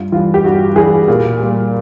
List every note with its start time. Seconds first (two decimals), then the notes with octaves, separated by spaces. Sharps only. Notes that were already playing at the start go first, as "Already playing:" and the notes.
Already playing: G2 F4
0.12 E3 G3 F4
0.34 G4
0.44 G2 F#4
0.76 E3 G3 G#4
1.08 A#2
1.40 G3 A#3